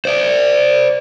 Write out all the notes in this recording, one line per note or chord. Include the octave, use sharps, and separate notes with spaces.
C5 D5